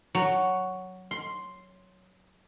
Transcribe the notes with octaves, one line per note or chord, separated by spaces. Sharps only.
F#3
C6